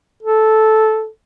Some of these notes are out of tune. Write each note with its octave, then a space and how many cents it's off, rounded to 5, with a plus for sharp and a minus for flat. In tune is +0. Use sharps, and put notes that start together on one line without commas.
A4 -10